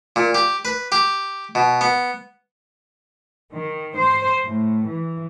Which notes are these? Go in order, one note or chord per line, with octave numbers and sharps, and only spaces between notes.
A#2
G4
B4
G4
B2
B3
D#3
C5
A2
E3